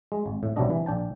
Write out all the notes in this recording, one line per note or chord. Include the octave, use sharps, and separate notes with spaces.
G#3
G#1
A2
B1 C3 F#3 G3 D4 D#5
E3
A#1 D4 G5 A5